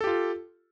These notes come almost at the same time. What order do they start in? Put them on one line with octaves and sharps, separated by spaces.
A4 G4 F4